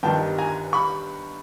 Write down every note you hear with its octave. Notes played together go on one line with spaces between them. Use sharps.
G1 G2 D#3 G3 G5 A5
G#5 A#5
B5 C#6